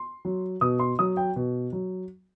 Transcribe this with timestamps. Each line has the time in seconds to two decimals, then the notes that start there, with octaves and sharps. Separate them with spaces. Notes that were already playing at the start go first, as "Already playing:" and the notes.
Already playing: C6
0.25 F#3
0.61 B2 D#6
0.79 C6
0.99 F#3 D#6
1.17 G5
1.36 B2
1.73 F#3